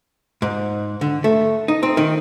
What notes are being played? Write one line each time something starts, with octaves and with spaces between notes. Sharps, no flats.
G#2
D3
A3
D#4
C4
D#3